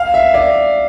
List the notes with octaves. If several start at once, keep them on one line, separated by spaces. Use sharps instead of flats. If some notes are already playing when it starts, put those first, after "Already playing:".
Already playing: F5
E5
D5